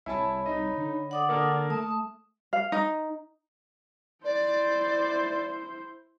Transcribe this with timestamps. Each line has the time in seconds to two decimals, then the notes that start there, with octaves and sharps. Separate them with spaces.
0.06 C2 E4 C#5 G#5 A5 B5
0.46 D#4 D#5
0.77 D3
1.11 D5 F#5 D6 D#6
1.29 A#3 A4 A#4
1.70 A3 A5 D#6
2.53 F5
2.72 D#4
4.24 E4 C5 D5